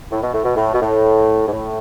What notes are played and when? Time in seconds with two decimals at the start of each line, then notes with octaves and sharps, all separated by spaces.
0.11 A2
0.22 B2
0.33 A2
0.44 B2
0.56 A2
0.73 B2
0.81 A2
1.47 G#2
1.51 A2